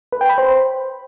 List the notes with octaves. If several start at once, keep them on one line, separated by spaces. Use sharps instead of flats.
B4
G5
B5
C5